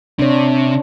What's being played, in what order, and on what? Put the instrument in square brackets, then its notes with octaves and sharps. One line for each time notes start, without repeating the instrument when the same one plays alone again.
[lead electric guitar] C3 [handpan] D4 C#5